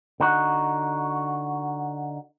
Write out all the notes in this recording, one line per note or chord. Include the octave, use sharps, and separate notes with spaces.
D3 D#4 F#4